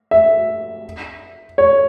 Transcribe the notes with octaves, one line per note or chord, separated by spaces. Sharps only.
E5
C#5